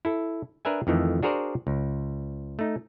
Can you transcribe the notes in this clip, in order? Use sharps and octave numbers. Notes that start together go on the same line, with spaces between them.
E4 A4
D4 A#4 B4 E5 G#5
F2 D#3 E3 A3
D4 F#4 G#4 A#4 C5 D5
C#2
A3 D#4